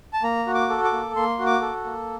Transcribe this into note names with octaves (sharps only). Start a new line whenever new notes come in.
A5
A#3 A#5
F#4
D6
A4
D6
A#3
A#3 C6
F#4
D6
A4
A#3